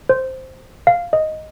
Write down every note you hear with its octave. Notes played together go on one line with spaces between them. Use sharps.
C5
F5
D#5